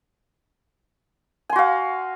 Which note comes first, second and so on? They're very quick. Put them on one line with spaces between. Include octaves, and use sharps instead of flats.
G#5 C6 F#4 F5